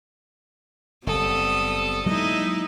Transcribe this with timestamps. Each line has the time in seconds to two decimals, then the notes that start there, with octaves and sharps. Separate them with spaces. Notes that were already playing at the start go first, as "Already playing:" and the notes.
1.07 F#1 G3 B3 C4 A4 D#6
2.06 F#3 G#3 A#3 D#4 E4 D#5